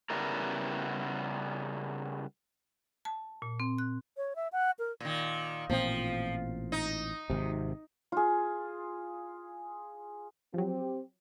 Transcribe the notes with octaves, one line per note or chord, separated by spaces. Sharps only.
C#3 G3 B3 E4 A#4
A5
A#2
C4
F#6
C#5
E5
F#5
A#4
A#2 D#3
A1 A#2 F3 C4
D#4
G#1 C3
F4 G#4
F3 F#3 C4 G4